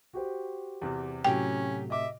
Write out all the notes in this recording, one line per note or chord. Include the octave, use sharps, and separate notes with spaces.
F#4 G4 C5
E2 C3
A2 C3 F#3 C#4 F#4 G4 G5
D#5 E5 D6